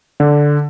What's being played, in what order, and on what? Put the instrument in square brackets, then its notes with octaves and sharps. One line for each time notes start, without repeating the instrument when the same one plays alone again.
[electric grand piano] D3